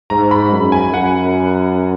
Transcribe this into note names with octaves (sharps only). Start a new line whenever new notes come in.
G#2 A#5
B5
F#2
G#5
F#2 F#5